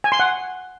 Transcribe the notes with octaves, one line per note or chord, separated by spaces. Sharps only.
G#5
C6
F#5